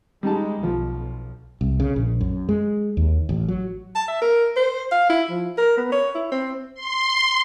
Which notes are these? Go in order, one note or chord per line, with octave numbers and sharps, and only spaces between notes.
G3 G#3 D#4 A5
B1 F3
C2
C#3
A#1
F#2
G#3
D#2
A1
F#3
A5
E5
A#4
C5
F5
E4
F3
A#4
B3
C#5
E4
C4
C6